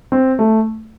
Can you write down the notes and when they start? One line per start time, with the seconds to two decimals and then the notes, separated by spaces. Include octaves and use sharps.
0.12 C4
0.39 A3